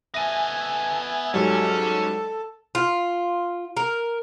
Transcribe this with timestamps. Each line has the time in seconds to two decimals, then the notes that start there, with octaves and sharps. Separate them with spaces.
0.14 B3 A4 E5 G#5 A#6 D#7
1.34 G#2 F#3 G3 C#4 A4
2.75 F4
3.77 A#4